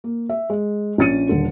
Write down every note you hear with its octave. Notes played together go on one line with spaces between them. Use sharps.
A#3
E5
G#3
A#1 C#4 A6 C#7 D#7
D#1 D3